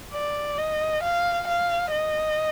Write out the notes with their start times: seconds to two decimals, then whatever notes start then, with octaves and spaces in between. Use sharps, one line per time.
0.14 D5
0.59 D#5
1.03 F5
1.47 F5
1.92 D#5